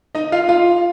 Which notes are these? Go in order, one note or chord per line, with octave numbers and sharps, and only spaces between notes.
D#4 D#5
F4 F5
F4 F5